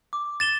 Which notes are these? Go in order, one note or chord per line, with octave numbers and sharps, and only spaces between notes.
D6
A6 E7 G7